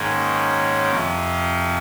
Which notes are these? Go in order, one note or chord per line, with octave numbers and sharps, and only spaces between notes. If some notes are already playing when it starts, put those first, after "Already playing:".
Already playing: G#2 D#3 A#3 C#4
F2 C3 F3